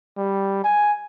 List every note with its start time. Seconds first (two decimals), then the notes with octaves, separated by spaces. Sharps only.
0.17 G3
0.64 G#5